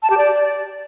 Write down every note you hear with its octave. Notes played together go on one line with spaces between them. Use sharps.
A5
G4
D5